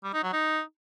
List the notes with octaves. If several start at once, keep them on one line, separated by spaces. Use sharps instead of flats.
G3
D#4
F#3
D#4